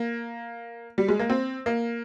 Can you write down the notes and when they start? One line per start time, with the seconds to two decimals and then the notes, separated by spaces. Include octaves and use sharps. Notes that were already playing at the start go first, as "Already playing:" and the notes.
Already playing: A#3
0.98 G3
1.09 G#3
1.19 A#3
1.30 C4
1.66 A#3